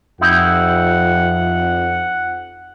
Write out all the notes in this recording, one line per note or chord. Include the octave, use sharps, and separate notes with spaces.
F2 D#4 E4 G4 F#5